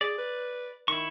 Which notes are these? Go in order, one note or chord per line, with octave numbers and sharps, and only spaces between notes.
G#4 D5
B4
D#3 E4 C#6